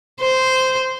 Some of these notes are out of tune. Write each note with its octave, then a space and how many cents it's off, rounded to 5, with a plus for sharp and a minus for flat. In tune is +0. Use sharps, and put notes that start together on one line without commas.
C5 -10